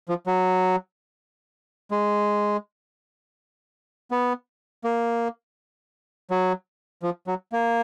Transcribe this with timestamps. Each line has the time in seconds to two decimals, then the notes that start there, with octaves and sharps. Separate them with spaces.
0.09 F3
0.27 F#3
1.91 G#3
4.11 B3
4.84 A#3
6.31 F#3
7.03 F3
7.27 F#3
7.52 A#3